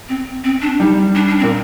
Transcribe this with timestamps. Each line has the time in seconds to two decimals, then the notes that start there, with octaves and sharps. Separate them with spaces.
0.09 C4
0.44 C4
0.62 D4
0.79 G3 D#4
1.15 D4
1.28 D4
1.39 C4
1.43 A#2